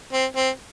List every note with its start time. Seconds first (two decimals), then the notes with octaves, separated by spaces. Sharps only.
0.13 C4
0.37 C4